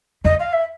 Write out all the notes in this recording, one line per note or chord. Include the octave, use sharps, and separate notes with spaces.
F2 D#5
F5
E5